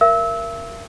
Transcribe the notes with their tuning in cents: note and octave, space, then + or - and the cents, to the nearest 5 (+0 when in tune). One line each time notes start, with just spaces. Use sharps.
A#4 +0 E5 +40 E6 -20